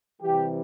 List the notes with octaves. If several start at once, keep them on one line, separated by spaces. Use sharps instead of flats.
C3 E3 G3 G4